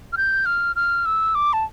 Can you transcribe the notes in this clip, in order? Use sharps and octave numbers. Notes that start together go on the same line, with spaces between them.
F6
G6
F6
F6
E6
D6
A5